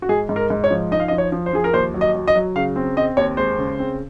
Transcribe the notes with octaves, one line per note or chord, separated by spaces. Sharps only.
F#4
G#2 G#4
G#2
A#4
G#2
C#5
F3
D#4 D#5
F5
D#5
F3
C#5
F3
C5
F3 G#4
A#4
D#2 C5
F#3
D#5
F#3
D#5
F#3
C#3 F5
C4
C4 D#5
D#2 C#5
G#3 C5
C#3
C4